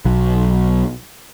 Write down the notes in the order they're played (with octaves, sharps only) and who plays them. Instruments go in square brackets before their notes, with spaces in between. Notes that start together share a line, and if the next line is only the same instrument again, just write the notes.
[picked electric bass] B1 F#3